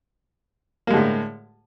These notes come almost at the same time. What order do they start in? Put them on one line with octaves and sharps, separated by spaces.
A#3 G#3 D3 A2